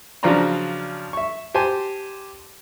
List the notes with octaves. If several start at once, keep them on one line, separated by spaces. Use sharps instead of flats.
C#3 F3 F#3 D4 A#5 C6
E5 C#6
G4 C5 G#5 A5 C6